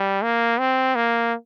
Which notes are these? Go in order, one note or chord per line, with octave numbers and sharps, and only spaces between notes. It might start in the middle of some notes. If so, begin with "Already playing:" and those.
Already playing: G3
A#3
C4
A#3